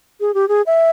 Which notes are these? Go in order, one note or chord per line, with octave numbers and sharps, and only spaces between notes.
G#4
G4
G#4
E5